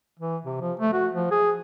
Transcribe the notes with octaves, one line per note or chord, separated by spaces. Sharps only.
E3
C3
F3
A3
F#4
F3
G#4